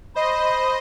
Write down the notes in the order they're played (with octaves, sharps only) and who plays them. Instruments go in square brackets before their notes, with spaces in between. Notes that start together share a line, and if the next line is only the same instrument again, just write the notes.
[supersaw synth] C5 D#5 [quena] B5